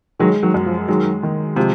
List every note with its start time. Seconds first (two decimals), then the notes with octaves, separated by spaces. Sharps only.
0.19 D#3 F#3 G#3
0.43 D#3 F#3
0.54 F#2
0.66 F3
0.88 D#3 F#3 G#3
1.23 D#3
1.56 C3 F3 G#3